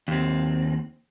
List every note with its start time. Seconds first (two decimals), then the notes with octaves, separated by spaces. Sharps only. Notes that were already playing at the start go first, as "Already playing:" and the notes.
0.08 D#2 C4